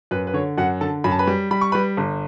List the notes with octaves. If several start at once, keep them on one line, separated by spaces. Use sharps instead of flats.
F#2 B4
B4
D3 C#5
F#2 F#4 F#5
D3 A4 A5
F#2 B5
A5
B4 B5
G3
G3 B5
C#6
G3 B4 B5
G1